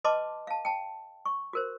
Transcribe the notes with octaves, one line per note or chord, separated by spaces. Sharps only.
B4 D#5 A5 C6 D6
F5 A5
G5 A5
C#6
F#4 A#4 C5